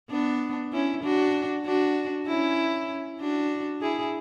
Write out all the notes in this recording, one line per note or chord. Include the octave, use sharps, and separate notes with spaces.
B3 D4
C#4 E4
D4 F#4
D4 F#4
C#4 E4
D4 F#4
E4 G#4